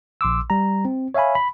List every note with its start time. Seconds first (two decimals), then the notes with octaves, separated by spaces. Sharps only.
0.21 A#1 C6 D6 E6
0.50 G3 A#5
0.85 C4
1.14 C#5 E5 F5 G#5 B5
1.35 B5